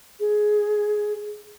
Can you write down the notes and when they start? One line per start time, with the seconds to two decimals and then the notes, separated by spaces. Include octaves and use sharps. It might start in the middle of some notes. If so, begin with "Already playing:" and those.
0.20 G#4